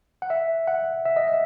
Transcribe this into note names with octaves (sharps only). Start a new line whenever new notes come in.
F#5
E5
F#5
E5
D#5
E5